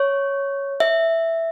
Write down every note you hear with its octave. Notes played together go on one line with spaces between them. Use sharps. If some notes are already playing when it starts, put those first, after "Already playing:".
Already playing: C#5
E5